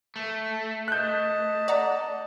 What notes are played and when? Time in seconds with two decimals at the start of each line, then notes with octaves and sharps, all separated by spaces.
0.16 A3
0.88 D#5 A5 F#6 G6
1.68 D5 F#5 A#5